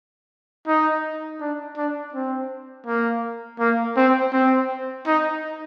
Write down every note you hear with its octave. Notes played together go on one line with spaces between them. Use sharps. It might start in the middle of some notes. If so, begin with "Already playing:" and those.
D#4
D4
D4
C4
A#3
A#3
C4
C4
D#4